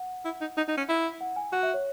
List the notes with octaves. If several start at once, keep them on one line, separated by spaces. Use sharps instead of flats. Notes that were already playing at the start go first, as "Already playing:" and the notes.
Already playing: F#5
E4
D#4
D#4
D#4
C#4
E4
F#5
G#5
F#4 F#5
E5
C#5